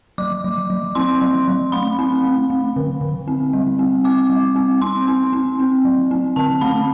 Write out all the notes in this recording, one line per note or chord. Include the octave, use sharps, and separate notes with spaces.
F#3 D6
F#3
F#3
C4 C6
F#3
F#3
A3 B5
C4
A3
A3
D3
D3
C4
G3
C4
C4 D6
G3
C4
C4 C6
C4
C4
C4
F#3
C4
D3 A5
A3 B5